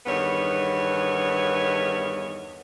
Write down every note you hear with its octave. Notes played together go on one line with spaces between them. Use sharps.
E2 G2 D#3 B3 C#5